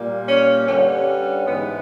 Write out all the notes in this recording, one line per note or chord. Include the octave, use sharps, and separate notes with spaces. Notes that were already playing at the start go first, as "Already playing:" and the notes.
Already playing: A#2 G3 A#3
C#4
G2 D3 G3 C#4
G#2 E3 G#3 B3